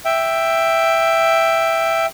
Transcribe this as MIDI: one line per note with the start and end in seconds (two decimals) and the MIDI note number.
0.05 2.06 76
0.05 2.06 79